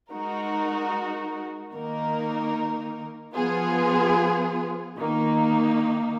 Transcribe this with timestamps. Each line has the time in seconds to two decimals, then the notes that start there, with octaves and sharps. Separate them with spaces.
0.12 G#3 D#4 F#4 A#4
1.74 D#3 A#3 D#4 A#4
3.35 F3 B3 F4 G#4
4.97 D#3 A#3 D#4